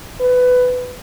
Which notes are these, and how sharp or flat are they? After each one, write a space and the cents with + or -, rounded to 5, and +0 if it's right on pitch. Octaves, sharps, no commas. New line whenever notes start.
B4 +15